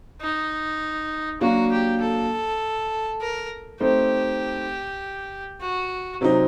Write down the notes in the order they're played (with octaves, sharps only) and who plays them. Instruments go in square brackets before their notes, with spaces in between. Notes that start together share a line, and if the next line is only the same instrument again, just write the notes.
[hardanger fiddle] D#4
[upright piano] F#3 A#3 D4 [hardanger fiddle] F#4
[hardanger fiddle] G4
A4
A#4
[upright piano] A3 C4 D#4 A4 C5 [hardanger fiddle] G4
[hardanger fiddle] F#4
[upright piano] C3 F#3 C4 D#4